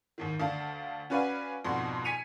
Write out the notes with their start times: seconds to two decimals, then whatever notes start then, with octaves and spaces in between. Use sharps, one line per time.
0.18 D#2 G#2 D#3
0.40 D2 D4 F5 A5
1.10 C#4 F#4 B4 D5 F5 G#5
1.65 F2 G#2 B2 F#4 D5 C6
2.05 G#5 G#6 B6 C#7 D#7 F7